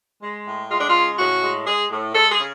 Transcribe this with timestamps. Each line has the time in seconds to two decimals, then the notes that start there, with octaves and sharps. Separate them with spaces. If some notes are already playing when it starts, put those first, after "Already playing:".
0.22 G#3
0.47 A2
0.71 G#3 F4
0.80 D4
0.89 F4
0.95 C#3
1.18 A2 F#4
1.43 G#3
1.67 G#3 G#4
1.91 A2
2.15 G#3 A4
2.31 G#4
2.39 C#3